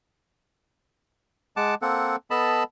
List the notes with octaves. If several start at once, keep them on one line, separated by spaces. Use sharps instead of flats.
G#3 F#5 A5 D6
A#3 C4 A4 F#5
B3 A4 D#5 A5 B5